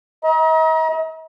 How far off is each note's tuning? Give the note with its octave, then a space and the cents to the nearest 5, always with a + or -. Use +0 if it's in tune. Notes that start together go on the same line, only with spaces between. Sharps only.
D#5 +45 A#5 +35